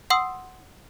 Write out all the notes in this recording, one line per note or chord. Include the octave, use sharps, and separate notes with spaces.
F#5 C6 D#6 E6